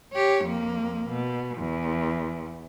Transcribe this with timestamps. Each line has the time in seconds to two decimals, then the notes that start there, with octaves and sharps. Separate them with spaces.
0.13 G4 C#5
0.45 F2 A#3
1.09 B2
1.58 E2